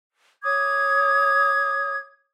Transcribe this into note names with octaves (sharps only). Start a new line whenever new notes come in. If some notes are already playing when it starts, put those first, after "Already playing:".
C#5 D6 D#6 G#6